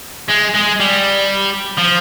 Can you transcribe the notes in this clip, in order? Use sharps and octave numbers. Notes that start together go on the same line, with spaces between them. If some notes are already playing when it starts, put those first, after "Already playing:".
G#3
G#3
G3
F3